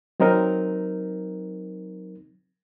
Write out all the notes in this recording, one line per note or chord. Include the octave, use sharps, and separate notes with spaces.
F#3 C4 D#4 A#4